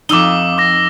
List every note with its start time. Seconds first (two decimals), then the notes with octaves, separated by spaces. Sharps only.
0.09 F2 D#4 D6 E6 G7
0.58 D6 A#6